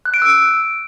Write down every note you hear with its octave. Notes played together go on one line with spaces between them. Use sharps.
F#6
D7
E6
D7